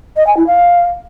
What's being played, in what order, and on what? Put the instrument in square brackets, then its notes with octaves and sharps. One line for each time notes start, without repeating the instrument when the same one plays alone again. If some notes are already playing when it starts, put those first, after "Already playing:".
[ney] D#5
G#5
E4
F5